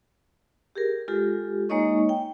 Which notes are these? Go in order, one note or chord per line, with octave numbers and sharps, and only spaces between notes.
G4 G#4 A#4
G#3 F4 G4 A4
G#3 A#3 D#4 C#5 D#5 C#6
G5